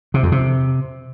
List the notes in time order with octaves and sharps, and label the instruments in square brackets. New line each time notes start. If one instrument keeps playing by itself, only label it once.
[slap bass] C3
F2
C3